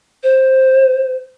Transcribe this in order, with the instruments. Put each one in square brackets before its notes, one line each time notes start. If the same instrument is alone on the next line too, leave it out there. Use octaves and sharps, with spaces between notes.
[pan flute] C5